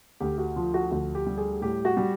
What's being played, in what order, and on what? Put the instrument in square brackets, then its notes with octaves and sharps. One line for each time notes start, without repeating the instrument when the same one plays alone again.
[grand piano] D2 G4
F#4
F3 F4
F#4
D2 F#4
G4
G3
G#4
A2 G4
F#4
G3